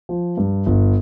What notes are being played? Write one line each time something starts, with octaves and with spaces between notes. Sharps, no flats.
F3
G2
G1